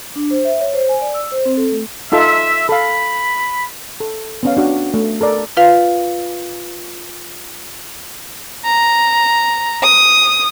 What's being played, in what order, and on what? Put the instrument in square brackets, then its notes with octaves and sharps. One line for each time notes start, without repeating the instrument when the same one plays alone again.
[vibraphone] D4
C5
E5
C#5
C5
G#5
D5
E6
C5
C4
A4
A3
[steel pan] D#4 F4 A4 [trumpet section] E5
[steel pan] A4 F5 [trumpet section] B5
[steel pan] A4
B3 C#4 F5
D4 F#4
A3
A4 A#4 D5
[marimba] F4 B4 F5
[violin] A#5
D#6